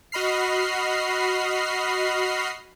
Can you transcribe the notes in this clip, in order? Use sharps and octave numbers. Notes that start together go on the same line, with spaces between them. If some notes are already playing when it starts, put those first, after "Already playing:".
F#4 D#5 B5 F6 C7